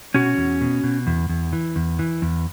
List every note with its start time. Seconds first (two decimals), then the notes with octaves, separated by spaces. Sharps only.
0.14 B2 C#4 F#4
0.37 E2
0.61 B2
0.84 B2
1.07 E2
1.29 E2
1.53 E3
1.76 E2
1.99 E3
2.22 E2